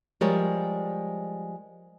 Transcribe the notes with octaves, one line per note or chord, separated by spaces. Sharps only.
F3 G3 G#3 A#4 C#5